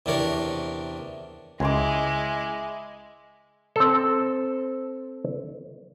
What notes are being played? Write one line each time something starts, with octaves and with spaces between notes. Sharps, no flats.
E2 C3 D4 A#4 C#5
C#2 G#3 E4 G#5 C6 D6
C4 A4